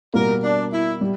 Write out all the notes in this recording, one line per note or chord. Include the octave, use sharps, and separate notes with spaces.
B2 G3 A#3 A#4
D4
E4
G3